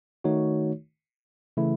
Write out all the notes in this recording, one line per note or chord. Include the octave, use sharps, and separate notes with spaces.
D#3 A3 D#4 F#4 C#5
C#3 E3 A3 E4